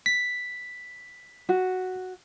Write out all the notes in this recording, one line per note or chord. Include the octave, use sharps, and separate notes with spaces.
B6
F#4